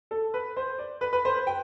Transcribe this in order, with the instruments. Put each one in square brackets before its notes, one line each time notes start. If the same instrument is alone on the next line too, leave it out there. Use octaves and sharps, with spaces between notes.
[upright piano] A4
B4
C5
D5
B4
B4
C5
B4
G5